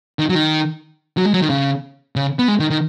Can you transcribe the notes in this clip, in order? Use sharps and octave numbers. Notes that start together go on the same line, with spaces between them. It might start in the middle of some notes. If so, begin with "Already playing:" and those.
D#3
F#3
D#3
F#3
G#3
F#3
D#3
C#3
C#3
B3
G#3
D#3
D#3